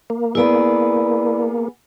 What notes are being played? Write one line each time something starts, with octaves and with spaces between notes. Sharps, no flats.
A#3
B3 E4 G#4 D5 B5